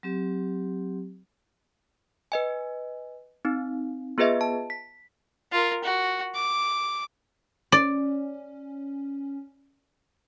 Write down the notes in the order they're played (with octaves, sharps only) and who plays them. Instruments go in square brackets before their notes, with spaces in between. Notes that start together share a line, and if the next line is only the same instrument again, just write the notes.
[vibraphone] F#3 C4 G4
[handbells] B4 D#5 G#5
C4 D#4
B3 F4 G#4 B4 D#5 E5
A5
B6
[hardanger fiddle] F4 A#4
F#4
D6
[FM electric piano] C#4 [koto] D5